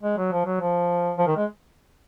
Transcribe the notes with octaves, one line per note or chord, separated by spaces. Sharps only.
G#3
F#3
F3
F#3
F3
F3
D#3
G#3